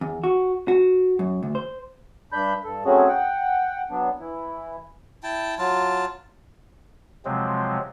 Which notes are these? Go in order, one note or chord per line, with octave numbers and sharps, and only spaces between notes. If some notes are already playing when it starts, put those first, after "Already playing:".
E2
F#4
F#4
F#2
D2
C5
G2 D4 B5 G6
G2 A4
F#3 A3 C4 C#4 F#4 G#4
F#5 G5
F#3 B3 D4
E3 E4
E4 G5 A5
F#3 F4 A5
C3 F3 F#3 G#3 C4